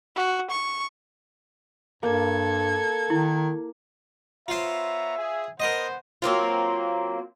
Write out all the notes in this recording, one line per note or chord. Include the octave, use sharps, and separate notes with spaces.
F#4
C#6
G2 A#3 A4 E6 G#6
D#3 E4
B3 F4 C5 C#5 E5 A#5
G#4
B3 A#4 C5 D#5 F#5
F#3 A#3 C4 F4